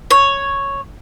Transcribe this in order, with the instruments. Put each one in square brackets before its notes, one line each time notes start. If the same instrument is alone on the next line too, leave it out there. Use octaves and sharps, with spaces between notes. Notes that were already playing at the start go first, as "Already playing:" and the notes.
[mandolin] C#5